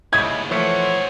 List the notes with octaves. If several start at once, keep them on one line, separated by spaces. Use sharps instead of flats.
D#2 C#3 E4 C#5 D#5 G#6
E3 F3 A3 C5 C#5 F#5